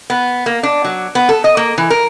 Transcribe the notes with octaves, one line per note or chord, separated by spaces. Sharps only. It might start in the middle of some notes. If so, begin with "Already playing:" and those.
B3
A#3
D4
F#3
B3
A4
D#5
A#3
E3
A#4